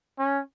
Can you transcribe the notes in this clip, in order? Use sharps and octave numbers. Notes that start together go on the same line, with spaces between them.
C#4